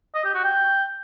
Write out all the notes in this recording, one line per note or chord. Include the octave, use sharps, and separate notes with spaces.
D#5
G4
F#4
G5